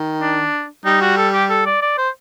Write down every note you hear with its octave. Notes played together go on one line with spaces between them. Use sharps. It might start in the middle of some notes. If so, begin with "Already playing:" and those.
Already playing: D#3
D4
G3 D#4
F#4
A4
G4
A4
D5
D5
C5